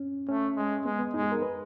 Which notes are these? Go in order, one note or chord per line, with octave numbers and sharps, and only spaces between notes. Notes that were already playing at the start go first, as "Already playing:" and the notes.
Already playing: C#4
A3 C#4
G#3
G#3 B3
B3
G#3 D#4
G#4
A#4
B4